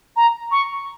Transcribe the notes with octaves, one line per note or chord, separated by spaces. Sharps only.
A#5
C#6